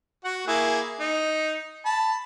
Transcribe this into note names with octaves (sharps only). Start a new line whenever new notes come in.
F#4 F#5
A#3 E4 G#4
D#4
A5 B5